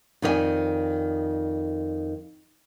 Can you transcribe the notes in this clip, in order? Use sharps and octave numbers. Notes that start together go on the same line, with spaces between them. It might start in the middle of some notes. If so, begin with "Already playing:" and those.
F2 D#3 G#4 D5 G#5